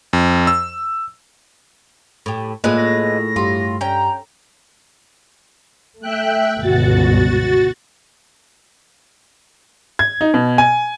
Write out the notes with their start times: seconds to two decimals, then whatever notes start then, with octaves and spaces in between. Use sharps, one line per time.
0.13 F2
0.47 E6
2.26 A2 G4
2.64 A2 G#3 A#3 F4 G#4 B4
2.77 A#6
3.36 G2 F4 G4
3.81 C#4 G5 A#5
6.00 A3 E5 G5 F#6
6.60 G1 C#2 B2 F#4 A6
9.99 G#6
10.21 D#4
10.34 B2
10.58 G#5